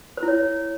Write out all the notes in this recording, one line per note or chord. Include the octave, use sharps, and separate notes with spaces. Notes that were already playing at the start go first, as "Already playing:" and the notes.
C5
E4
C#5